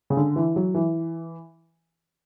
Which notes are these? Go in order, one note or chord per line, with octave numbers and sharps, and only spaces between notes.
C#3
D3
E3
F#3
E3